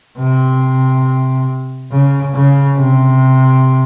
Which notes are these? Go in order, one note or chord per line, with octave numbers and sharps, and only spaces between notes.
C3
C#3
C#3
C3